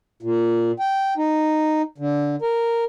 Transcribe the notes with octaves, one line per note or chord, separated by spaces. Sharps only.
A#2
G5
D#4
D3
A#4